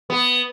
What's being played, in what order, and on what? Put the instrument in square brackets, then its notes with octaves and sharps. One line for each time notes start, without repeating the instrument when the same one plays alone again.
[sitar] B3